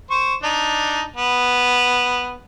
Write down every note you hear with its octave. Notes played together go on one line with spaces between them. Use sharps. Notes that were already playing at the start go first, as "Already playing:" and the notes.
C5 C#6
D4 D#4
B3